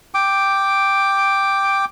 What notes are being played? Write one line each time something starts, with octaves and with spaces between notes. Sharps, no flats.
G5 D6